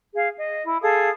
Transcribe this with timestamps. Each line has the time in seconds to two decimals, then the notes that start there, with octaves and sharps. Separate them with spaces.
0.14 G#4 F5
0.36 D#5
0.66 E4
0.83 G#4 A4 F5 D#6